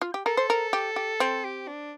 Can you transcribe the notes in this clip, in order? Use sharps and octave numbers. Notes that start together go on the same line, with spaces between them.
F4
G4
A4 A#4
C5
A#4
G4
G4
C4
G4
D4